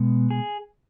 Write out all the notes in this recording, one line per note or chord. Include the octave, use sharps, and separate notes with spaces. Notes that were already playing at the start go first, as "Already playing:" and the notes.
Already playing: B2 G#3 B3
G#4